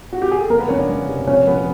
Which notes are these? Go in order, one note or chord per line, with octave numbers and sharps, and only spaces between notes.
F#4
G4
G#4
A4
F#1 A#3 A#4
B3 B4
F#1 C#4 C#5
D4 D5
F#1
C3
A#1 C#4 C#5
F3 B3 B4